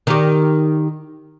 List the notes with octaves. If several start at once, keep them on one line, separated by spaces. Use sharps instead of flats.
D#3 G4